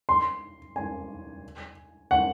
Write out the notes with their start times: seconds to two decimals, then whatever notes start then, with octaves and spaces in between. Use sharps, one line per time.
0.09 C6
0.76 G#5
2.11 F#5